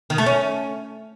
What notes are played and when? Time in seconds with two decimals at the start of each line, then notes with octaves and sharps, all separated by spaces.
0.10 D#3
0.18 A3
0.26 C#4